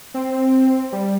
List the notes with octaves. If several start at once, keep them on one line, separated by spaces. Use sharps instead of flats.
C4
G3